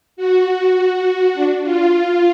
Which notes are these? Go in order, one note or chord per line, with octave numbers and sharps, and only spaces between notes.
F#4
D4
F4
F4